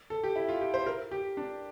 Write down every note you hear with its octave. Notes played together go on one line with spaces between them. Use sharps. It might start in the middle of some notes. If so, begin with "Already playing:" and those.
A4
G4
E4
F4
G4
C5
A#4
G4
D4